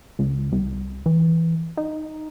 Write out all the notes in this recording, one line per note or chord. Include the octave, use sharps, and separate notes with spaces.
C#2
C2
E3
D#4